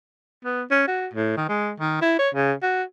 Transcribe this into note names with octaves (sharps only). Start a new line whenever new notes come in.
B3
C#4
F#4
A2
D#3
G#3
D#3
E4
C#5
C#3
F#4